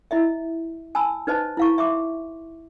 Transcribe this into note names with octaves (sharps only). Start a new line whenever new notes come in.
E4 D#5 E5
G#5 A5 B5 E6
D#4 B4 C5 D#5 A5
E4 F5 C#6
E5 C6 D6